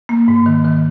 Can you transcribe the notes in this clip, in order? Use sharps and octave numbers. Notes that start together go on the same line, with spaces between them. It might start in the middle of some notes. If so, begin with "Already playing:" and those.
A#3
G#2
D#3
D#3